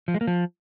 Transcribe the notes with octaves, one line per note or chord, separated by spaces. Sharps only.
F3
G#3
A#3
F3